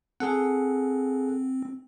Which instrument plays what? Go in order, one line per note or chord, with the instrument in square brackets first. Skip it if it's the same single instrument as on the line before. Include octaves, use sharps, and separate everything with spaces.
[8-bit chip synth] C4 [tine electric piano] G#4 A4 F#5